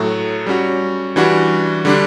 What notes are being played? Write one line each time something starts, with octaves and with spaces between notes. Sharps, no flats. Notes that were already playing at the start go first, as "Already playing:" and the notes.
Already playing: A2 F#3 A3
G3 C#4 F#4
E3 G3 D4 F#4
D3 G3 D4